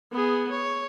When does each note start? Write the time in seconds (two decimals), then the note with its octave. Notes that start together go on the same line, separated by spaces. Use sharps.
0.12 B3 G#4
0.50 C#5